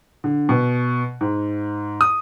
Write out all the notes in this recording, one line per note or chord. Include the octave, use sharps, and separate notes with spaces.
D3
B2
G#2
D#6